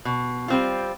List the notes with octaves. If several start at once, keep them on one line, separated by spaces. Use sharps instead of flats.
B2
G3 C4 F4